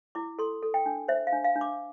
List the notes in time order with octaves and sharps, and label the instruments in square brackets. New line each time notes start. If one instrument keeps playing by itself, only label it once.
[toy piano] E4 D6
A4 C6
A4
G5
D4
C5 E5
F5
D4
F5
D4
D6